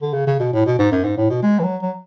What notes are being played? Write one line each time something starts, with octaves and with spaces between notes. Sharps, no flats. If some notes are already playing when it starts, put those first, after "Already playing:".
D3
C#3
C#3
B2
A2
B2
G#2
F#2
G#2
A2
B2
G#3
E3
F#3
F#3